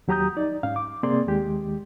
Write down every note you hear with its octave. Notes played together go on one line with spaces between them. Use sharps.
D#2 F#3 G4 A#5 D#6 G6
D#4 D5
G#2 C#4 F5
D6
C3 A#3 C4 G#4 D5 C6
D#2 D#3 G#3 G4